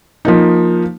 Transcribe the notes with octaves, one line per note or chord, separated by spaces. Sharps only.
F3 A#3 D#4